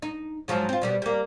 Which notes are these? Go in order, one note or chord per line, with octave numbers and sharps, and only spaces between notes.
D#4
G#2 F3 F#3
C4 F4
B2 G3 B3
G3 A#3